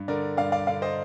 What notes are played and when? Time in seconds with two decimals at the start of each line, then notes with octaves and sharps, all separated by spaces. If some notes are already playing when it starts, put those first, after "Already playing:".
Already playing: G2
0.08 D3 A#4 D5
0.37 G2 D5 F5
0.52 D5 F5
0.67 D3 D5 F5
0.82 C5 D#5